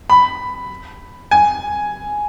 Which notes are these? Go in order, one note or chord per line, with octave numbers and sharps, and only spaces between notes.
B5
G#5